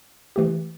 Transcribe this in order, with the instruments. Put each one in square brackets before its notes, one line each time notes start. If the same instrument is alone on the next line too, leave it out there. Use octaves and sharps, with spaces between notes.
[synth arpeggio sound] E3 A3 G4